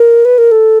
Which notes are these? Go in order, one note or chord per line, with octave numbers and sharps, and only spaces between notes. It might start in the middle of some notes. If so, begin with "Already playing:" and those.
Already playing: A#4
B4
A#4
A4